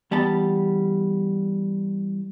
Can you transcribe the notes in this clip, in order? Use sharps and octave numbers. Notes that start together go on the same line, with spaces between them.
E3 G3 B3 A5